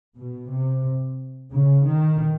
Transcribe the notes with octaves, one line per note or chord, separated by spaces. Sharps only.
B2
C3
C#3
D#3